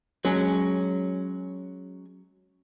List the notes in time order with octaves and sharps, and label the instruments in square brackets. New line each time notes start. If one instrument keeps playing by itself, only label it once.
[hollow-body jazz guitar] F#3 G#3 C#4